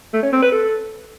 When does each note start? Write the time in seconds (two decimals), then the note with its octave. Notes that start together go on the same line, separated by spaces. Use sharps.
0.13 A3
0.23 C#4
0.33 C4
0.42 B4
0.52 A4